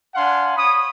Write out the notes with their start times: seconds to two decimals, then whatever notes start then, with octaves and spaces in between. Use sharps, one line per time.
0.15 D4 F5 F#5 G#5 C6
0.56 C#5 B5 D#6